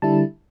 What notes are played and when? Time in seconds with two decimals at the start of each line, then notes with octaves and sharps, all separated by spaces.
0.02 D3 G3 E4 A5